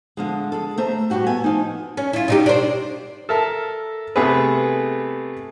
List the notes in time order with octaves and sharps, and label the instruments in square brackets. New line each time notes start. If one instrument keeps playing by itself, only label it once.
[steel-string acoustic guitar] D3 F3 G#3
G#3 A4
A3 C5 A#5
A2 G3 A#3 F#4 G4
A3 B3 E5 G#5
F3 D#4
[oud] C#4
E4 F4
B2 D#4 G4
D4 C5
[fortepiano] A4 A#4 E5 A5
C3 A3 B3 G#4 B4